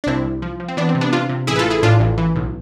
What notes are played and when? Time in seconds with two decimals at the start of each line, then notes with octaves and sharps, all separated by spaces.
0.04 D4
0.07 C2 C4 E4
0.25 C2
0.42 F3
0.60 F3
0.68 C4
0.77 E3 B3 D4
0.89 C4
0.95 C3
1.01 B3 D4
1.13 C3 D4 F4
1.29 C3
1.47 A1 E4 G#4
1.56 B4
1.59 F4 A4
1.65 A1
1.70 E4 G#4
1.83 A2 D4 F4
2.00 A1
2.18 E3
2.36 B1